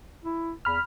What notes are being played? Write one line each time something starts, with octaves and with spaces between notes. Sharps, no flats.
E4
E2 B5 F6